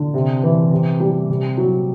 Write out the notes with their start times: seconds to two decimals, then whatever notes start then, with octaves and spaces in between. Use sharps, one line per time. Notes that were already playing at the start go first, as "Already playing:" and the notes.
Already playing: D3
0.14 C3
0.43 E3
0.72 C3
1.00 G3
1.29 C3
1.58 F#3